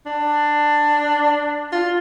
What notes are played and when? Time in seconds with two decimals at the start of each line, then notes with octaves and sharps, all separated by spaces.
0.06 D4
1.73 F4